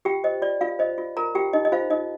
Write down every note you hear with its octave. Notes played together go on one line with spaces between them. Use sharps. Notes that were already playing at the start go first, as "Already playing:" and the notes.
F4 G4 G5
C5 D#5
F4 D5
F4 F5
C5 D#5
F4
F4 A#4 A#5
F4 G4 G5
D#4 D#5
D#5
F4 C5 F5
D#4 D#5